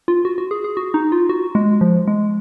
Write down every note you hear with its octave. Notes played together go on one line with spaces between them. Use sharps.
F4
F#4
F#4
G#4
G#4
F#4
D#4
F4
F#4
G#3
F3
G#3